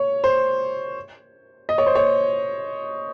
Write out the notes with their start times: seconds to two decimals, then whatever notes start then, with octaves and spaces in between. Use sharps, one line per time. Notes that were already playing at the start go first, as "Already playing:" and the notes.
Already playing: C#5
0.24 C5
1.69 D#5
1.78 C#5
1.86 C5
1.95 C#5